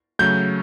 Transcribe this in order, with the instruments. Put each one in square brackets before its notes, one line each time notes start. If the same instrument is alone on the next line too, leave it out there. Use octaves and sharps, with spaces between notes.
[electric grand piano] C#3 F#3 A3 [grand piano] G6